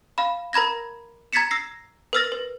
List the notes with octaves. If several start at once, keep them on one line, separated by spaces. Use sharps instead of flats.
F5 B5
A#4 A#5 B5 G#6 A#6
A#5 G#6 A6 B6 C#7 E7
E6 A#6 C7
A#4 B4 E6 F6 A6 A#6
B4